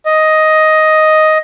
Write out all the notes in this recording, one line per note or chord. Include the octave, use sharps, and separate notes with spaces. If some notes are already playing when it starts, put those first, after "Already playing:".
D#5